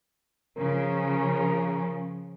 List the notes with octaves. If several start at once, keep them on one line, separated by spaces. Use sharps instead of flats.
C#3 F3 A#4